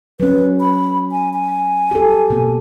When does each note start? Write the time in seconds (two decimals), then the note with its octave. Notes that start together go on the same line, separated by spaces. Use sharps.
0.20 F#3 C#4 B4
0.60 B5
1.11 G#5
1.33 G#5
1.91 G4 A4
2.30 B2 A#3